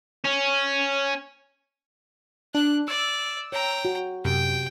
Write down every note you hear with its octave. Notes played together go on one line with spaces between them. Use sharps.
C#4
D4 F#6
D5 E6
C#5 G5 A#5
F#4
F#2 C3 G5